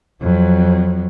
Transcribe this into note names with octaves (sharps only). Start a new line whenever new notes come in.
F2 F#3